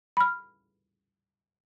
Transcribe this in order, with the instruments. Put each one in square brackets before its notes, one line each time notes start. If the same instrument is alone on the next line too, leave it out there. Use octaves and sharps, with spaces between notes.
[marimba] B5 F6